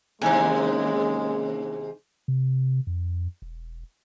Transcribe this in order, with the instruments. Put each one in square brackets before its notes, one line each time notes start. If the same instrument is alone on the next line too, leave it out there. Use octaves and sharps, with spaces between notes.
[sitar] D#2 G#2 C3 [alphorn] G#3 [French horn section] A#3 C#4 [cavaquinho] D#4 G#5
[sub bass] C3
F2
E1